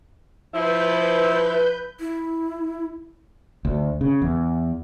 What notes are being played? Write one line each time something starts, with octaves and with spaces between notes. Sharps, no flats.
F3 E4 B4 G6
E4
D2
C#3
E2